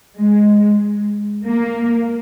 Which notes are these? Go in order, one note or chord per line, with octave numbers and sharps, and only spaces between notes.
G#3
A#3